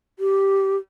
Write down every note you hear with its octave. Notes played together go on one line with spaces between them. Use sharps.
G4